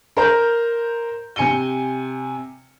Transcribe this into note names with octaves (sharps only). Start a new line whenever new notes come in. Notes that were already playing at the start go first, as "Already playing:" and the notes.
A#4 C5 A#5 G6
C3 G#5 C#7 D#7 G7